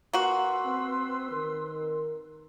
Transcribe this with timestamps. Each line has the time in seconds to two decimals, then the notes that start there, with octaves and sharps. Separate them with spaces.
0.13 A#3 F#4 B4 C6 E6
0.66 C4
1.32 D#3 A#4